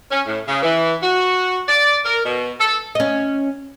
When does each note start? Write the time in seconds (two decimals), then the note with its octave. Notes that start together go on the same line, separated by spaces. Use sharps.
0.11 C#4
0.27 A2
0.48 C#3
0.63 E3
1.02 F#4
1.68 D5
2.05 A#4
2.25 B2
2.60 A4
2.95 C#4 D#5